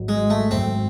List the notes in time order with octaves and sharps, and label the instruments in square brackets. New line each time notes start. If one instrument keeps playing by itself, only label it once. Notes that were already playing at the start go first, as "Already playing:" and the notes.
Already playing: [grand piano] G#1 G#2 F#3
[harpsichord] G#3
A3
[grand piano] G#1 G#2 F#3 [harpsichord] C4